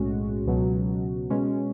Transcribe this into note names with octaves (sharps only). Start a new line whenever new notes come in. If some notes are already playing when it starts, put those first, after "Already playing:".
Already playing: B1 A2 G#3 C#4 F#4
C#2 B2 F#3
B2 G#3 C#4